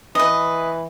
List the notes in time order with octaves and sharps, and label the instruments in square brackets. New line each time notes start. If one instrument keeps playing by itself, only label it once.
[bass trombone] E3 [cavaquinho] B4 D#5